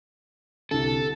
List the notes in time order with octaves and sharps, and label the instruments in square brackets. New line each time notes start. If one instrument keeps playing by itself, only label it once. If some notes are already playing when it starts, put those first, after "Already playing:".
[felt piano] C2 D3 [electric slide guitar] A4